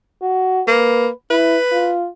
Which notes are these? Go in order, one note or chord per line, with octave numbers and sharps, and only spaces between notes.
F#4
A#3 B4
E4 B4
F4